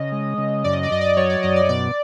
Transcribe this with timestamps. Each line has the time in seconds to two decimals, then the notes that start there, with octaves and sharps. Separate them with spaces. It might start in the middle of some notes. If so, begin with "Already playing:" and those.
Already playing: C#3 D#5
0.12 G#3
0.38 C#3
0.64 F#2 D5
0.73 D#5
0.83 D5
0.91 F#2 D#5
1.01 D5
1.17 F#3 C#5
1.30 D5
1.43 F#2 D#5
1.56 D5
1.69 B2 D5